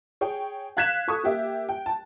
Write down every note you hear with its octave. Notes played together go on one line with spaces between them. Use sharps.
G#4 C#5 G5
F5 F#6 G#6 B6 E7
A4 C#6 D#6
A#3 G4 E5
G5
A5